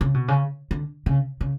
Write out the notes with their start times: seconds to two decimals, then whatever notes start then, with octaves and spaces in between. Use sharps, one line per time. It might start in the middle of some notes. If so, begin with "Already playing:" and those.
0.01 C#3
0.14 B2
0.28 C#3
0.71 D3
1.06 C#3
1.41 C#3